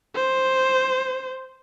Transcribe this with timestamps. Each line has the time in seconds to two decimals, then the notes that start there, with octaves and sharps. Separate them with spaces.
0.16 C5